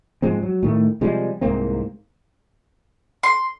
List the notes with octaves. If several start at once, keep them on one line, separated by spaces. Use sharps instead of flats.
G#2 F3 G#3 C4
F#3
A2 D#3 A3
C3 F3 G3 G#3
C2 G#2 A#3 C4
C6